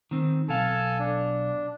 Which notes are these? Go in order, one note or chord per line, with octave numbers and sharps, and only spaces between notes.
D#3 C4
B1 A4 F5 G#5 A5
D4